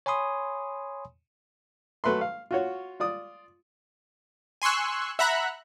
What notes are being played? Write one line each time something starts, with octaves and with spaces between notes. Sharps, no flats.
C#5 G#5 B5 C6 D#6
F#3 A3 B4 E5 C6
F5
F4 F#4 C#5
F4 D5 D#6
G#5 C6 C#6 E6 F#6
E5 F#5 A#5 B5 F#6